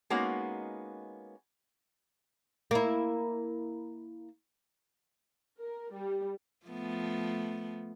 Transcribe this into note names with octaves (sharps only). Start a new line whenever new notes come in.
G#3 A#3 B3 C#4 D#4 F#4
A#3 E4
A#4
G3
F3 A3 B3